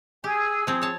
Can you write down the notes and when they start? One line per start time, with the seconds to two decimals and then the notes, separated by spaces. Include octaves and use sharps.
0.24 G4 G#4 G#5 E6
0.67 F3 C4 G#4
0.81 C#5 A5